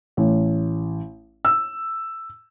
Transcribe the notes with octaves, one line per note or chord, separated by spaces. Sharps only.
A1
E6